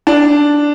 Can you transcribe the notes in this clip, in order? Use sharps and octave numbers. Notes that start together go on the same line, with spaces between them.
D4